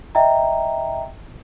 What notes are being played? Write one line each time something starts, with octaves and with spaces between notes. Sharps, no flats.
D#5 E5 G5 A#5